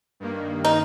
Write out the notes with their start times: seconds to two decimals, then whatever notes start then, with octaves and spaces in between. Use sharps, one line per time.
0.20 G2 D#3 A#3
0.65 D#4